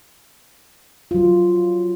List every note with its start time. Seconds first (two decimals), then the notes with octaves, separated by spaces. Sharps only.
1.11 F#3 F4